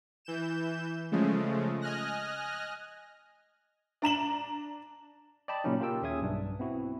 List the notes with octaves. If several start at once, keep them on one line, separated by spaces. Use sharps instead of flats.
E3 G6 E7
C#3 F3 G#3 A3
D#5 G#5 F6 F#6 A#6
D4 A#5 E7 F#7
D5 D#5 G5 A5 B5
A#2 C#3 F#3 A#3 C#4 D#4
F4 G4 A#4 G5 E6
D#2 C#4 G#4 E5 D#6 G#6
B1 G2 D4
B3 C4 E4 F#4